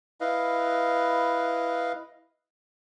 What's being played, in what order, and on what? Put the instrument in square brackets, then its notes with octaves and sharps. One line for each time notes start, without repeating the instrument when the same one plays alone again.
[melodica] E4 B4 D#5 F5